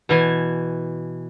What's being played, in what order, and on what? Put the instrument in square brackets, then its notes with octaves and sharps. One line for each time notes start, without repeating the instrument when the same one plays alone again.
[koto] B2 E3 G#5